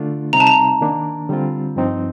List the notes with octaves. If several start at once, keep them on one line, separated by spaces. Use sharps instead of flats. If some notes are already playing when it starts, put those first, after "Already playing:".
Already playing: D3 A3 D4 F4
C3 G3 C4 D#4 A#5
A5
A#5
D#3 A#3 D4
D3 G3 C4 F4
G2 F3 C4 D#4